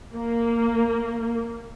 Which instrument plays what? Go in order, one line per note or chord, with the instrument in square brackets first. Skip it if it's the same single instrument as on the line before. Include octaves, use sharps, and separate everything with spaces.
[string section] A#3